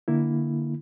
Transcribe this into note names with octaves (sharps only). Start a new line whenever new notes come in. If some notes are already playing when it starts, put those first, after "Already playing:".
D3 A#3 E4